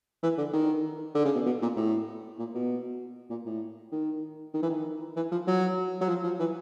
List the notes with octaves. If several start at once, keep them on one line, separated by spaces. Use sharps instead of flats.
E3
D3
D#3
D3
C#3
B2
B2
A#2
A2
A#2
B2
A#2
A2
D#3
D#3
E3
D#3
E3
F3
F#3
F#3
F3
F3
E3